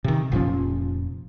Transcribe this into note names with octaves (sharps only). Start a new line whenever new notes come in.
C3 D#3
F1 A#2 F3 C#4